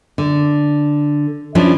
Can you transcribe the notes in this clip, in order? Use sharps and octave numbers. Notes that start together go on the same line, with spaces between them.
D3
E3 F3 C#4 D4